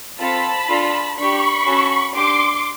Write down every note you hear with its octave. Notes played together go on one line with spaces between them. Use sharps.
C4 F4 A4 A5 B5
D4 F4 A4
D4 G4 B5 C#6
C#4 F#4 A4
D4 G4 C6 D6